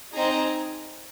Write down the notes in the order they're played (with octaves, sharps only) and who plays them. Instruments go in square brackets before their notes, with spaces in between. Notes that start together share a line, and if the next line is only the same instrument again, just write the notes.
[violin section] C4 D#4 G#4 A#5